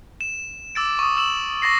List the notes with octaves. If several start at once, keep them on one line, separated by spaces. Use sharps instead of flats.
E7
D6 E6 A6 D7
C#6 D#6
E6 E7 F#7
C#6 A6 A#6 C7